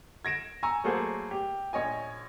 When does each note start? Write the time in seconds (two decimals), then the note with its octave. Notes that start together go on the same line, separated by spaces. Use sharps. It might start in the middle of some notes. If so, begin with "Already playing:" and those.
0.25 G#6 A#6 D7 E7
0.63 G#5 A#5 C#6 E6
0.84 F#3 A3 A#3 F#4 G#4 C5
1.31 G4
1.73 A#1 C#5 D#5 G#5